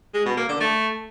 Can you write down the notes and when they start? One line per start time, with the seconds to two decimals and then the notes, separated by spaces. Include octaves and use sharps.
0.14 G#3
0.26 B2
0.37 A#3
0.49 D3
0.60 A3